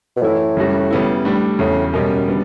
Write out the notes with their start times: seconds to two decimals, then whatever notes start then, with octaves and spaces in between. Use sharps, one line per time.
0.16 B2
0.22 F#2 A2 E3 A3 E4
0.57 F#2 C#3 G3 C#4 F#4
0.91 C#3 G3 B3 E4
1.25 A2 G3 D4
1.59 E2 A2 C#3 F#3
1.93 F#2 B2 G3 C#4
2.28 D3 G3 B3